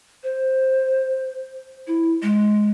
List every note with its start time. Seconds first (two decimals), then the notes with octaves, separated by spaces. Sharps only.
0.23 C5
1.87 E4
2.22 G#3